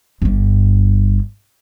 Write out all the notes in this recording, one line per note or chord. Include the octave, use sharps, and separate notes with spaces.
G1 G2